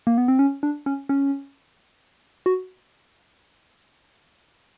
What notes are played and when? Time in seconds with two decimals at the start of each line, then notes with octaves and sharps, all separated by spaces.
0.07 A#3
0.18 B3
0.28 C4
0.39 C#4
0.63 D4
0.86 C#4
1.09 C#4
2.46 F#4